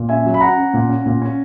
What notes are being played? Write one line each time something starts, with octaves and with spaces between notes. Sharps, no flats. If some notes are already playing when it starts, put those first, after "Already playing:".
Already playing: A#2
C#4 E5 G#5
F#3
B5
C#4 F#5 A#5
C#4
A#2
C#4
A#2
C#4